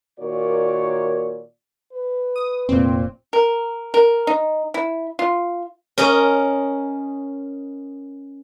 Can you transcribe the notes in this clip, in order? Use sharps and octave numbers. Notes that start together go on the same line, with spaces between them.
A#2 D#3 F#4 A#4 C#5 D5
B4
D#6
F1 A#2 C4
A#4
A#4
D#4
E4
F4
C#4 A#4 D#5